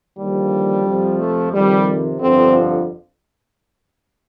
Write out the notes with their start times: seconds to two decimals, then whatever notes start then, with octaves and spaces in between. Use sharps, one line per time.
0.17 D#2 D3 F3 G3
0.85 F2 C3 F3
1.19 A3
1.52 F2 C3 D#3 G3
2.19 G1 F2 D3 F3 C4